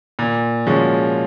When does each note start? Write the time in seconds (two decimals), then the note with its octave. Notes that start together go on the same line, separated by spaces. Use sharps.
0.19 A#2
0.67 F3 G#3 C#4 F#4